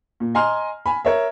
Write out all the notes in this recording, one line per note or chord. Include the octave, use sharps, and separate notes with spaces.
A#2
D#5 G#5 A#5 C6 F6
G#5 B5
A#4 C#5 E5